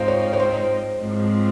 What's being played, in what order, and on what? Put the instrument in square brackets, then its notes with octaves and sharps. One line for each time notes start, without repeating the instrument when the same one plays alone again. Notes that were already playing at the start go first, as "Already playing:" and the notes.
Already playing: [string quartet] G#2 F3 C4 D#4 [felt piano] C5 F5
[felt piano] C#5
C#5
C5
[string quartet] G#2 F3 C4